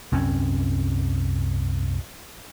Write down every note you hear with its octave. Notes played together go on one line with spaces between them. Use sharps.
C2 F#2 C4 C#4